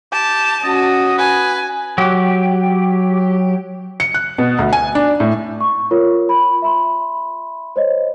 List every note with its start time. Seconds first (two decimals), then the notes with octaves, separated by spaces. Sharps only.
0.12 G4 A5
0.64 C#4 F#4 D#5
1.18 B4 G#5
1.98 F#3 G4
4.00 C#7
4.14 F#6
4.38 B2
4.59 D2
4.73 G#5
4.95 D4
5.20 A2
5.61 C#6
5.91 F4 A#4 C#5
6.29 B5
6.62 E5 B5 C6
7.76 C5 C#5 D#5